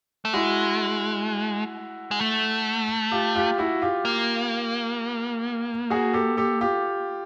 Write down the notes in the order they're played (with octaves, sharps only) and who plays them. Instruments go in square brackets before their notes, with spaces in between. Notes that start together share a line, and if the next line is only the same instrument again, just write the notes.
[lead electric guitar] A3
[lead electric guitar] G#3 [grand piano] E4 F#4
[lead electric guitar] G#3
A3
[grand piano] F4 G4
F4 G4
E4 F#4
F4 G4
[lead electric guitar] A#3
[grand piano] F#4 G#4
G4 A4
G4 A4
F4 G4